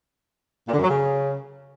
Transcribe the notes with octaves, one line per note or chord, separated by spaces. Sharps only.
A#2
D3
F#2
F#3
C#3